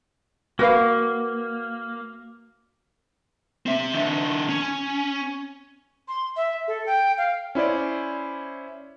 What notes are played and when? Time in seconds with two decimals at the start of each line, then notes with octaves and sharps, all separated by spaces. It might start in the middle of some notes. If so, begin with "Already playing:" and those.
0.59 A#3 F#4 B4 F5
3.66 C4 E5
3.94 D#3 D4
4.49 C#4
6.08 C6
6.37 E5
6.68 A4
6.86 G5
7.18 F5
7.55 C#4 E4 C5 D5